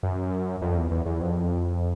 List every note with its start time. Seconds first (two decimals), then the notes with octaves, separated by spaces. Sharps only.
0.03 F#2
0.62 F2
0.77 E2
0.91 E2
1.06 E2
1.21 F2